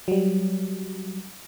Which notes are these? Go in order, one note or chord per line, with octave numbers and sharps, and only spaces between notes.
F#3 G3